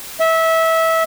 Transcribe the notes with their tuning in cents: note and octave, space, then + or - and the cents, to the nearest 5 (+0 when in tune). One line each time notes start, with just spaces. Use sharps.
E5 -20